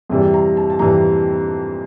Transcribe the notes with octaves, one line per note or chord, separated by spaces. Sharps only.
F2 C3 E3 G3
A#5
A5
A5
F2 C3 E3 G3 A#5